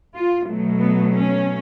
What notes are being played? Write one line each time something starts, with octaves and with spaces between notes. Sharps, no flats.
F4
B2 F#3 A3
B3
C#4